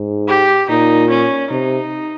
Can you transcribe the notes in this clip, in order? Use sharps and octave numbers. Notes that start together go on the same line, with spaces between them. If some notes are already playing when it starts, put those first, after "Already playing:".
Already playing: G#2
G4
A#2 D#4
C#4
C3 D#4